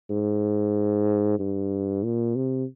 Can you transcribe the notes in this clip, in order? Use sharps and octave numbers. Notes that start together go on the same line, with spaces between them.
G#2
G2
A#2
C3